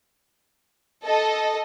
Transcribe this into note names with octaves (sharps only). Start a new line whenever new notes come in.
A4 D#5